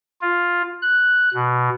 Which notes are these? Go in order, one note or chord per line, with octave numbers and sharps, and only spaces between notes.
F4
F#6
B2